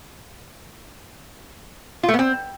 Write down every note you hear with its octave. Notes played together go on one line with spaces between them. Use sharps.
F4
A3
B3
C4